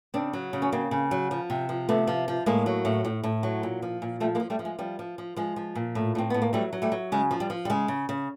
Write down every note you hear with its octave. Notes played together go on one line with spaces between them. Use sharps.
C#3 C4 D4
F#3
C#3
C#4
C#3 A#3 C4
C#3
F#3
F3
C3
F3
C3 A3 B3
F3
F3
A2 G#3 A#3
F#3
A2
A2
A2
F#3
A#2
F3
A#2
F3 G3 A3
G#3 A#3
F3
G3 A3
F3
G#3
F3 G3
F3
F3
F3 G#3
F3
A#2
A2
A2 C4
A2 B3
A#3
F#3 G3 A3
F#3
G3 A3
F#3
C#3 G#3
F3
G3
F3
G3
C#3 G#3
C#3
C#3